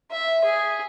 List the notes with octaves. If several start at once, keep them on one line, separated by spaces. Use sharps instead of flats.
E5
G#4